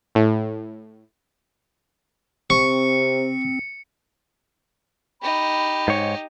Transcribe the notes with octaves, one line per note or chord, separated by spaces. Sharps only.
A2
C3 C4 C#6 C#7
D#4 G4 B5
G#2 C#5